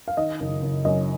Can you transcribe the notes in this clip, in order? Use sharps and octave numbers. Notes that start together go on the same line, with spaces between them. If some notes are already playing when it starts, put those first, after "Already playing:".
F5
D#3 D#5
F#1
F#1
F#2 D#5